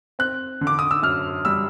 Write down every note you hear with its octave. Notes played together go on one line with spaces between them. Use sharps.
C4 F#6
D3
D6
D#6
E6
F#2 F6
G3 E6